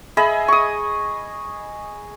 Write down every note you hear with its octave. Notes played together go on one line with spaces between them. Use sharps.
G#4 D#5 E5 B5
C#6 D#6